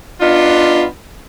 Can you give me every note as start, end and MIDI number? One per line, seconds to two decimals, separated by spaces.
0.21 0.85 59
0.21 0.85 62
0.21 0.85 63
0.21 0.85 65